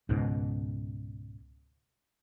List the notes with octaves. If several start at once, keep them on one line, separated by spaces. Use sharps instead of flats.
C#2 G#2 B2